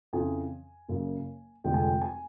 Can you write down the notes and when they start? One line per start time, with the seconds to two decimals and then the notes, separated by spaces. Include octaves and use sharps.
0.13 F2 C#3 E3 G#5
0.89 F#1 F#2 C#3
1.64 F1 F2 D3 F3 G#3 G5
1.74 G#5
1.83 G5
2.01 G#5